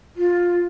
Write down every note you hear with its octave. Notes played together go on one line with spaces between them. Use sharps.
F4